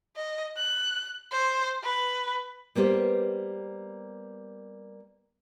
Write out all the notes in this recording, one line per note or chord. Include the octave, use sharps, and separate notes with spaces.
D#5
F#6
C5
B4
G3 A#3 B3 G4 C5